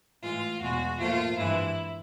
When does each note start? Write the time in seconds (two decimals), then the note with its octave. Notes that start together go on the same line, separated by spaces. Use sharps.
0.22 A2 E3 G#3 F4
0.61 E2 B2 G#3 F#4
0.99 A#2 F3 A3 F4
1.38 G2 E3 G#3 E4